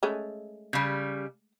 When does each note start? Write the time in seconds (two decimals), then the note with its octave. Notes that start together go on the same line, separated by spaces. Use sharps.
0.03 G#3 A3 C#4
0.73 C#3 G3